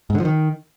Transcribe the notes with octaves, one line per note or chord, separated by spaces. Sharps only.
G#2
D3
F3
D#3